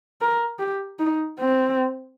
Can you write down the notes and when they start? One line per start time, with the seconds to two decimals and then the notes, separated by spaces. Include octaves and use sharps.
0.21 A#4
0.59 G4
0.99 D#4
1.39 C4